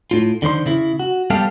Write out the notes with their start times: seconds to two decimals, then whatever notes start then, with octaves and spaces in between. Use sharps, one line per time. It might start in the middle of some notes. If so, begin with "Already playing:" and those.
0.11 A2 F4
0.42 D3 D#3 C5 C6
0.66 C#3 E4
0.99 F#4
1.30 G3 B3 G4 A4 F5